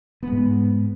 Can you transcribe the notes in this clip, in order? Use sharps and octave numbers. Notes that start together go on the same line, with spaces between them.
G#2 G#3 B3